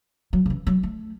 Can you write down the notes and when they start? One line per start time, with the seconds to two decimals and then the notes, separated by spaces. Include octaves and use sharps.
0.33 F#3
0.46 C#3
0.50 E3
0.67 F#3
0.83 A3